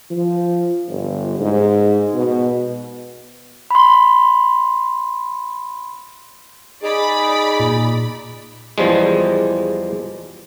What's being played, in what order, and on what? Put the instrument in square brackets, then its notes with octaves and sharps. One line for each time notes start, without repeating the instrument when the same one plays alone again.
[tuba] F3
G1
G#2
B2
[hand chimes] B5 C6
[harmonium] D#4 G#4 [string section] D5 B5
[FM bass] A#2
[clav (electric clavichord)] E2 F3 G3 G#3